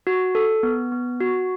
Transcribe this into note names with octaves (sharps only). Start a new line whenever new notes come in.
F#4
A4
B3
B3
F#4